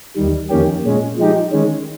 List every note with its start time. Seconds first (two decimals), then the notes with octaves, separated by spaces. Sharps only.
0.16 D#2 D#3 G3
0.50 F2 D#3 A#3 C#4 G4
0.84 A#2 G#3 C#4
1.17 F3 G#3 D#4 G4
1.52 D#3 G#3 C#4